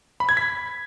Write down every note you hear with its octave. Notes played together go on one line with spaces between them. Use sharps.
B5
G#6
B6